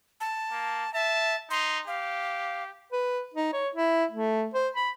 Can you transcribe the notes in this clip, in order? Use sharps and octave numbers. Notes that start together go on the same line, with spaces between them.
A5
A#3
E5 A5
D#4 C6
G4 F5
B4
D#4
C#5
E4
A3
C5
B5